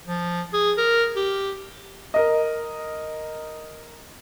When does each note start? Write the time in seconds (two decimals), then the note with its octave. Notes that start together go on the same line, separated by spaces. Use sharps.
0.07 F3
0.54 G#4
0.78 A#4
1.16 G4
2.14 A#4 D#5